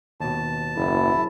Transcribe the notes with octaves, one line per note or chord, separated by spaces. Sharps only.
D#2 B2 A5
F#1 E4